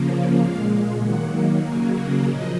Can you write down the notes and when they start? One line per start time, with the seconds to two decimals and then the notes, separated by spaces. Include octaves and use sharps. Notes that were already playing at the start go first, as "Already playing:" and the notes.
Already playing: C#3 F3 A#3
0.39 A#2 G#3 F5
1.02 D#3 F#3 A#3 F#5
1.64 C#3 F#3 A#3 G#5
1.96 F#5
2.27 A#2 F3 D#5